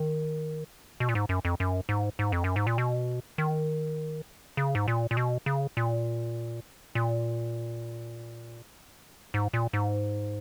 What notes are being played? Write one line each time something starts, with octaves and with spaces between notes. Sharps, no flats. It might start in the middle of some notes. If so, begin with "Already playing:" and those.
Already playing: D#3
B2
A#2
G#2
F#2
F2
F#2
G#2
G#2
F2
F#2
G#2
A#2
B2
D#3
C#3
G#2
A#2
A#2
B2
C#3
A#2
A#2
G#2
A#2
G#2